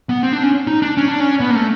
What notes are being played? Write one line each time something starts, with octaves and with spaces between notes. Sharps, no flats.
B3
C4
D4
C#4
D#4
D4
C#4
D4
C#4
B3
A#3
A3